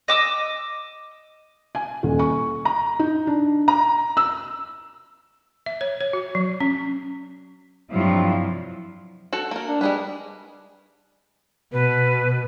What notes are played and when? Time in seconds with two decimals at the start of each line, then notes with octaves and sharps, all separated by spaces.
0.08 D#5 D6 E6
1.75 G#5
2.03 D#1
2.19 C#6
2.65 A#5
2.99 D#4
3.27 D4
3.68 A#5
4.17 E6
5.66 E5
5.81 C#5
6.01 C#5
6.13 F#4
6.35 F#3
6.60 C#4
7.91 G2 C3 F3 F#3 E4 F4
9.33 F#4 A4 A5
9.51 A#3 A#4
9.68 D4
9.81 G3 G#3 G#4 B4
11.73 B2 B4